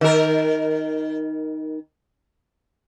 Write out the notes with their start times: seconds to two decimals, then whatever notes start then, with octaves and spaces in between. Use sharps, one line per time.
0.01 D#3 A#4